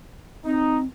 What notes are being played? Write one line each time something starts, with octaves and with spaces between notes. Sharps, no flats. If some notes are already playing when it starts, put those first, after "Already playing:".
C4 D#4